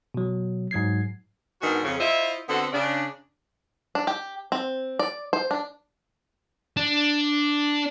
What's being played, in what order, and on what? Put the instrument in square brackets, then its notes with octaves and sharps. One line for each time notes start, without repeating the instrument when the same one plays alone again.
[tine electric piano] B2 F#3
G#2 F#3 G#6 C7
[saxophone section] G#2 D#3 B3 D4 F#4
F2 C#3
E4 F4 C5 D#5 E5
D3 B3 C4 F#4 A4
C#3 D4
[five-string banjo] D4
G4
C4
D5
C5
D4
[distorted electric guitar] D4